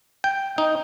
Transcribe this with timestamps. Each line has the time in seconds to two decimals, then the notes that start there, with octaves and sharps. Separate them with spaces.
0.24 G5
0.58 D#4